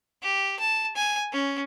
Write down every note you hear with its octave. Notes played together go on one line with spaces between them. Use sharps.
G4
A5
G#5
C#4